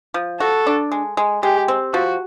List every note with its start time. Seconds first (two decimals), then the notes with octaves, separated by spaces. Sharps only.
0.14 F3
0.40 F#4 A4
0.67 D4
0.92 G#3
1.17 G#3
1.43 G#3 G4
1.68 C4
1.94 F3 F#4